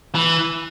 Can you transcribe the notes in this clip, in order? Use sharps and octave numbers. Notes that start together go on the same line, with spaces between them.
E3